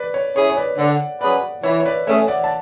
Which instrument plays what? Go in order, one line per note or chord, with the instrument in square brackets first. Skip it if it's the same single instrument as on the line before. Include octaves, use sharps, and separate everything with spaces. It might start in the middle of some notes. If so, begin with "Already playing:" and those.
Already playing: [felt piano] B4 D5
C#5
[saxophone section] C#4 E4 G#4 [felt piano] C#5
[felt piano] C#5
B4 D5
[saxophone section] D3 [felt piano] D5 F#5
[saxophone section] F#3 C#4 G#4 B4 [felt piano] D5 F#5
[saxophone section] E3 [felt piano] C#5 E5
[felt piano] C#5
B4 D5
[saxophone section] A3 C#4 G#4 [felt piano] C#5 E5
[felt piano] D5 F#5
A5